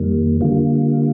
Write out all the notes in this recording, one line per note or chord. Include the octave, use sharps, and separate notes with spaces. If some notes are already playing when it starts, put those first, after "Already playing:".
Already playing: F2 D#3 G3 A#3
D3 G3 A#3 F4